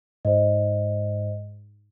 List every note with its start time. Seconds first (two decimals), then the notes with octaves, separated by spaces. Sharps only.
0.25 G#2 C5 D#5